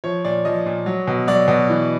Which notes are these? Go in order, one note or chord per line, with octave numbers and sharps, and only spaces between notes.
F3 C#5
A#2 D5
F3 D#5
A#2
F#3
B2
F#3 D5
B2
E3